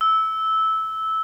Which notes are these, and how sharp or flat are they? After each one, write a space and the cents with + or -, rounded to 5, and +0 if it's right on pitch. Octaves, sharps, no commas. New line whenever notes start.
E6 -15